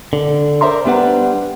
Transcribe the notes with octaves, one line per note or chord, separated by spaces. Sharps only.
D3
A#4 C5 D5 E5 A#5 C6
G3 B3 D4 B4 F#5